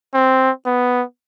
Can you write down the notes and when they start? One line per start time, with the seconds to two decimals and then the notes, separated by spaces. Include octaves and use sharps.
0.14 C4
0.66 B3